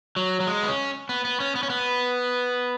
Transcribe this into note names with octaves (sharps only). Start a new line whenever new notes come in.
F#3
F#3
G#3
B3
C#4
B3
B3
C#4
B3
C#4
B3